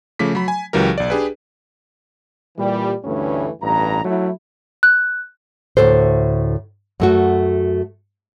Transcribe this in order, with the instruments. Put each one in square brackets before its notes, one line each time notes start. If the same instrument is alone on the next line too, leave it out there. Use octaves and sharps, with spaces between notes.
[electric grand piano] C#3 F3 A3 D6 B6
F#3 B5
G#5
C#2 E3 F#3 G4 A#4
B1 D5
D4 G4 G#4 B4
[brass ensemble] A#2 E3 G3
D2 G2 E3 A3 C#4
A1 G2 A#5
F#3 A3 E4
[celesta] F#6
[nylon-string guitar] D2 A2 C3 A4 C5
F#2 A3 F#4